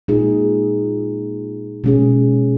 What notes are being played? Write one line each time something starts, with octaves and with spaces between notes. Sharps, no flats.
A#2 G#3 D#4 G#4
B2 G#3 C#4 G#4